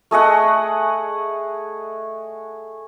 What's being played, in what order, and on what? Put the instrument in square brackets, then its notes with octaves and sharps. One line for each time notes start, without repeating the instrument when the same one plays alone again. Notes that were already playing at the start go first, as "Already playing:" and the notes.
[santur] A3 G#4 D#5 F#5